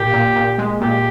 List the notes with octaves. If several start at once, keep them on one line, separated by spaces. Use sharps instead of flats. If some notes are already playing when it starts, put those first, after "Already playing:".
Already playing: A#2 G4
A#2
A#2
G#3
A#2 G4